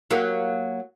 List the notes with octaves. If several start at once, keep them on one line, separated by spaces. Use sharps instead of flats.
F#3 A#3 G4